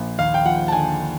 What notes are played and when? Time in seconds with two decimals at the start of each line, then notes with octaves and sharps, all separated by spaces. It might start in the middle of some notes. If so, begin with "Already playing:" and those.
Already playing: A#1
0.18 D#2 F5
0.34 G5
0.45 F3 F#5
0.68 A5
0.72 D3 G#5